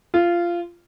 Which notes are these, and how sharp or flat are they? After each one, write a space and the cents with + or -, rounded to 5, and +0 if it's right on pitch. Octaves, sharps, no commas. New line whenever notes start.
F4 -15